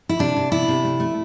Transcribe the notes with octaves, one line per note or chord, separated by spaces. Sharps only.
E4
C3 D4
C3
B3 E4
C3
A3
A3